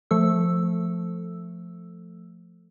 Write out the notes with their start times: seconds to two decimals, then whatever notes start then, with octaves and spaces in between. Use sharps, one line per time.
0.11 F3 A3 A4 E6